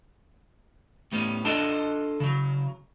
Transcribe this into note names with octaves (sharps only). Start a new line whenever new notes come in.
A2 G3 B3 C#4
D4 F4 A4 D#5 A5
C#3 F#3